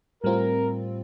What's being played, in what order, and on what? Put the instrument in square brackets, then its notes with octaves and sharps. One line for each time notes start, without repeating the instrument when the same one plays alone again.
[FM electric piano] A2 G3 C4 F4 [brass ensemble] A#4